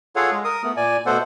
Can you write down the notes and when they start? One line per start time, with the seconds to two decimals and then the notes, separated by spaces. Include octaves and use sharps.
0.16 F4 G#4 A4 C#5 F5 F#5
0.31 G#3
0.44 A#4 D#6
0.64 A3 B3
0.77 A#2 D5 G#5
1.06 B2 A3 B3 A4 C5 F#5